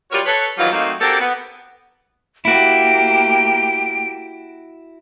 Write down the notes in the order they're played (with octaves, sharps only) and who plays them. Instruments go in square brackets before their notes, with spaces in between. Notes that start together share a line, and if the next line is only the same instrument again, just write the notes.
[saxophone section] G3 F4 F#4 A#4 C#5
A4 B4 C#5
D#3 E3 F#3 G3 F4
F#3 A3 A#3 C4 D#4
A#3 C4 D4 F#4 G4 A4
B3
[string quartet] A#3 G4 [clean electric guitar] E4 F#4 [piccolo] D7